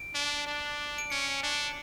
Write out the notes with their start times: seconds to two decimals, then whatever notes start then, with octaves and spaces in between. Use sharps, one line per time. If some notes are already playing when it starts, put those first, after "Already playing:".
Already playing: D7
0.15 D4
0.47 D4
0.98 D7
1.10 C#4 C#7
1.43 D4